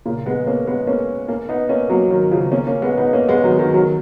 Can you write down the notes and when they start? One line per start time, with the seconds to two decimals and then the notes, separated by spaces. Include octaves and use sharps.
0.06 A#2 C#3
0.26 G#3 B3
0.46 A#3 C#4
0.67 G#3 B3
0.87 A#3 C#4
1.28 A#3 C#4
1.49 B3 D#4
1.69 A#3 C#4
1.90 F#3 A#3
2.11 D#3 F#3
2.31 C#3 F3
2.52 A#3 C#4
2.67 A#3 C#4
2.82 G#3 B3
2.97 B3 D#4
3.13 A#3 C#4
3.28 G#3 B3
3.44 D#3 F#3
3.59 D#3 F#3
3.74 D#3 F#3